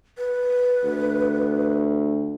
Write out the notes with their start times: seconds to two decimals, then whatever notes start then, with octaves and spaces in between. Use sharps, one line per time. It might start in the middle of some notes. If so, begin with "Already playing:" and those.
0.18 B4
0.84 D2